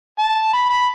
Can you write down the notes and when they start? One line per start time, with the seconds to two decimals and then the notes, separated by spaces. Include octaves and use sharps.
0.18 A5
0.53 B5
0.70 B5